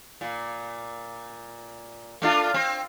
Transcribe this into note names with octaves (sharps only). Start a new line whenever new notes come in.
A#2
A3 D4 F4
C4